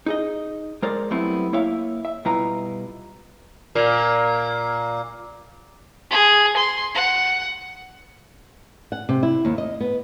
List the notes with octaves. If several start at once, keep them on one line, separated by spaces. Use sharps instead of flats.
D#4 G#4 D#5
G#3 A#4 C5 D5
F#3 G3 A3 B3 C4 E4
A#3 E4 C#5 E5 F5
E5
B2 G3 E4 F4 B4 A#5
A#2 A#3
G#4
C6
F#5
F#5
C3
E4
D#2
D#5
B3